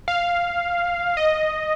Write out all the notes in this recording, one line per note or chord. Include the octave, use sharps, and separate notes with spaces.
F5
D#5